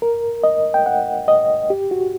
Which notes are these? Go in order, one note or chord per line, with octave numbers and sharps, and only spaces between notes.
A#4
D#5
G5
F#5
D#5
G4
F#4